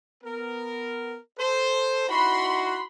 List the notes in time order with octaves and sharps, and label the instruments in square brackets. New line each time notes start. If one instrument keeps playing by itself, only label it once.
[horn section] B3 A#4
A4 C5
[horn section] D#4 E4 F#4 [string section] B5 C6